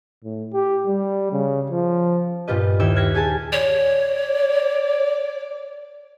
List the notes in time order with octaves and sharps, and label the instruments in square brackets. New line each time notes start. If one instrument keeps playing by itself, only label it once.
[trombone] A2
G4
G3
C#3
F3
[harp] G2 A#2 F4 G4 B4 D#5
D#2 D#4 E4 G5 E6
F6 F#6 G#6 A#6 B6 C#7
G4 G#4 G#5 A5
[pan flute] C#5 [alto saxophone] D5